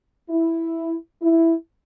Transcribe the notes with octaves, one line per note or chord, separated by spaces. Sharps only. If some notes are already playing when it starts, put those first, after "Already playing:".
E4
E4